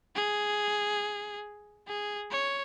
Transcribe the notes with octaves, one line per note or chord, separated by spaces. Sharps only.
G#4
G#4
C#5